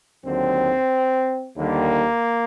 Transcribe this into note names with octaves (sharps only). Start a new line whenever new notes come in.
D#2 D3 F#3 C4
D#2 D3 G3 A#3